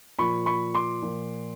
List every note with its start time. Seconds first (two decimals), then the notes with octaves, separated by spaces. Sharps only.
0.19 A#2 F3 B5 C#6
0.46 B5 C#6
0.74 C6 D6
1.02 A#2 F3